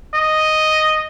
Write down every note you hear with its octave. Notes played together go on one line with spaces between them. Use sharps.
D#5